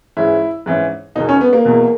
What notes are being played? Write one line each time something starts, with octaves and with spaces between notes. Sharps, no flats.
G#2 E3 G#3 C#4 E4
G#2 E3 G#3 C#4
E1 E2 B2 D#4
C#4
B3
A#3
E1 E2 B2